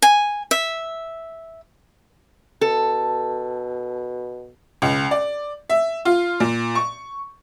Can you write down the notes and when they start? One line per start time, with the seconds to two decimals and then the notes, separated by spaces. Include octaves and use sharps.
0.02 G#5
0.51 E5
2.61 B2 A4
4.82 C#2
5.11 D5
5.70 E5
6.05 F4
6.40 A#2
6.75 C#6